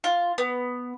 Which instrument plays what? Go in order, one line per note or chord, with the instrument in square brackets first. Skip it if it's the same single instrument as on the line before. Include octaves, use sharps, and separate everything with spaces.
[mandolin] F4
B3